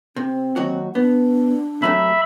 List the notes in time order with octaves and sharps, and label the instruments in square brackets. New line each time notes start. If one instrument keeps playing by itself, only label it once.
[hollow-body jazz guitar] C3 [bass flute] C4
[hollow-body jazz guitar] D#2 F#3 F#4
[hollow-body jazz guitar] B3 [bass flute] D4
[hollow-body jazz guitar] C3 F#3 A3 [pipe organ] E5 B5